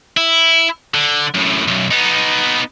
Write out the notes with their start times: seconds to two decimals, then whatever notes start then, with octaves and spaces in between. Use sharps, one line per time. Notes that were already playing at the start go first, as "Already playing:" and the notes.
0.17 E4
0.94 D3
1.34 F#2 A2
1.68 B1 F#2
1.91 B3 D#4